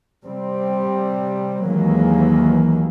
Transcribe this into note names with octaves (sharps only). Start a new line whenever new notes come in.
C3 G3 C4
D#2 D#3 E3 F#3 G#3 A#3